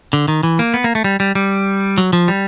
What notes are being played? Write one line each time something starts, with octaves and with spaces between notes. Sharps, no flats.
D3
D#3
E3
A#3
B3
A#3
A3
G3
G3
G3
F#3
F3
G3